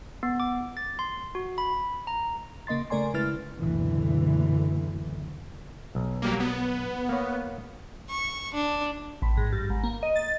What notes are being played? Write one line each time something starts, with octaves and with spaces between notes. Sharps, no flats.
B3
D6
A6
C6
F#4
B5
A#5
C#3 A#3 D#5 C6 A6
C#3 A3 A#4 D5 G#5 C6
C#3 G#3 E4 B4 F6 A6
F#1 D2 B2 D3 E3
B1
F#3 G3 A#3
B3
A#3 C#5
C#6
D4
A1
G#2
G2
G#1
A#3
D#5
A6